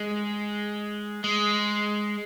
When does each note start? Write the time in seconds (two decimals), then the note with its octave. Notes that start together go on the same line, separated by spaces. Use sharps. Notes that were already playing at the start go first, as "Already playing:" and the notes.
Already playing: G#3
1.24 G#3